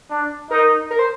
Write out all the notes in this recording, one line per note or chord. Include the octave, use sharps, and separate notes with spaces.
D4
D#4 A#4
A#4
C5